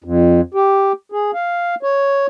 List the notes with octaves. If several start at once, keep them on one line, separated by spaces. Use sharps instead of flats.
F2
G4
G#4
F5
C#5